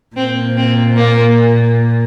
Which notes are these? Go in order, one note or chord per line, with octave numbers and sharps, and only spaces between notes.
A#2 C4
C4
A#3